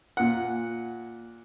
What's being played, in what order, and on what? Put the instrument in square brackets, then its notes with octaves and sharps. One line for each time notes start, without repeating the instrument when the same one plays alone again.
[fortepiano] A#2 F#5